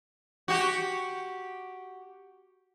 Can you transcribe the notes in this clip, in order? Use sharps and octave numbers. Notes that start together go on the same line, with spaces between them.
F#4 G4